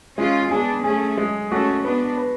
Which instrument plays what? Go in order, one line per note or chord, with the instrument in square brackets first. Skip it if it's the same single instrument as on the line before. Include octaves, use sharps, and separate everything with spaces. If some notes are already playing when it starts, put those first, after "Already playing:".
[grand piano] G#3 [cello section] C#4 F4
[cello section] B3 D4 [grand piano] G#4
[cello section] A3 C#4 [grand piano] G#4
[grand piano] G#3
[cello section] A3 C#4 [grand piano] F#4
[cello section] B3 D4 [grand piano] B4
[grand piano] B4